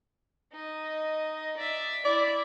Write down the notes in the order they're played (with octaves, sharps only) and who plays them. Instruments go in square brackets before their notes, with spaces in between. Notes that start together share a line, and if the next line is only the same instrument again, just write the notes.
[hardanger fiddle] D#4 D#5
D5 E5
[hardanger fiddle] E4 [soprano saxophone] D5